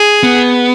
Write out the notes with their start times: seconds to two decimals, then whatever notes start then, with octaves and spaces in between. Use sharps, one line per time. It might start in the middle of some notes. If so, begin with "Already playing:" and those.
Already playing: G#4
0.23 B3